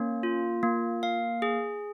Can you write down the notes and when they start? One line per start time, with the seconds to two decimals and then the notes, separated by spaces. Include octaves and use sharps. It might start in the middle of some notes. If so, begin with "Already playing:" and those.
Already playing: A#3 C#4
0.23 F4
0.63 A#3
1.03 F5
1.42 G#4